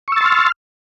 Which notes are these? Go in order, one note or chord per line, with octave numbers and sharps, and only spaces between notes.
C6 C#6 E6 F6 A6